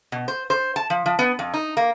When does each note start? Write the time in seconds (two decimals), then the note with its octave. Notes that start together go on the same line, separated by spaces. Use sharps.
0.12 B2
0.28 C5
0.50 C5
0.76 A5
0.90 F3
1.06 F3
1.19 B3
1.39 F2
1.54 D#4
1.77 A#3